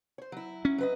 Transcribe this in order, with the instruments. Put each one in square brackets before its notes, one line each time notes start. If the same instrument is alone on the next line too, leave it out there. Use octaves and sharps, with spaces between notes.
[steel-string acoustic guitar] C5 C#5
F#3 E4
[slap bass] C#4
[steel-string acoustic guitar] F#3 B4 D#5